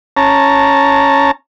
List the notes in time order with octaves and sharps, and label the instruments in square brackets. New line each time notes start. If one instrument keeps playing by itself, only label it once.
[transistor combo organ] C#4 A5 A#5